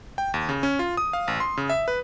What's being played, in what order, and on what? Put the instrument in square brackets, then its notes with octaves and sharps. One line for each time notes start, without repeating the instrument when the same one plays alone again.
[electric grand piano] G5
D#2
C#3
C#4
F4
D#6
F5
A1
C6
C#3
E5
B4